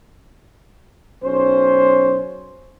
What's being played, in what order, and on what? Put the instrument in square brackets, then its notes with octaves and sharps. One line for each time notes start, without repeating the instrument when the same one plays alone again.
[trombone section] B1 C#4 C5